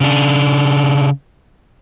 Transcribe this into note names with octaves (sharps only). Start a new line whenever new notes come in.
C#3 D4